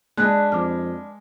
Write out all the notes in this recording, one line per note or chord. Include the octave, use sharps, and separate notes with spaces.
G#3 D4 B4 F#6
F2 D6 F6